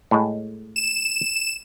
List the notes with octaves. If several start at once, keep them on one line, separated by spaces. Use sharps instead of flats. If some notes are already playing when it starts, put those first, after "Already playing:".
A2 G#3
E7